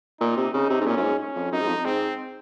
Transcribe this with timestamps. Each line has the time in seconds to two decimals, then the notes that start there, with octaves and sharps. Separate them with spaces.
0.20 A#2 D#4
0.37 C3
0.54 C#3 D#4
0.70 C3
0.81 G#2
0.86 A#2 C#4
0.97 F#2
1.03 G#2
1.20 C#4
1.36 F2
1.52 F#2 D#4
1.60 G#2
1.68 F2
1.85 G#2 C4